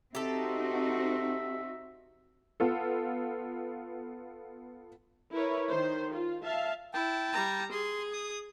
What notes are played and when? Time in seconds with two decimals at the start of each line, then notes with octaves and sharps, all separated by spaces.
0.15 C4 D#4 F#4 G4 A4 E5
2.60 B3 F4 A4
5.31 E4 A#4 B4 C#5
5.69 D#3 C5
6.13 F4
6.43 E5 F5 A5
6.94 E4 G5 A5
7.33 G3 A#5
7.72 G#4 C6
8.13 D#6